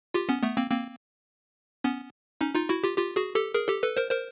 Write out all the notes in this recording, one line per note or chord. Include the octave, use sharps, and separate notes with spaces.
F4 G4
B3 C#4
A3 B3
A#3 C4
A#3 C4
B3 C#4
C#4 D#4
D#4 F4
E4 F#4
F4 G4
F4 G4
F#4 G#4
G4 A4
G#4 A#4
G4 A4
A4 B4
A#4 C5
A#4 C5